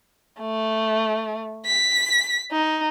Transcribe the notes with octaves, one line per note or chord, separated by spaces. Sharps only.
A3
B6
D#4